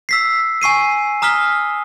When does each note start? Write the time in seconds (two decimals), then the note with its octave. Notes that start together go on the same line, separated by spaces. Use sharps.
0.09 E6 B6 C7
0.62 G#5 C#6 C7 D#7
1.22 A#5 D#6 F6 B6 G7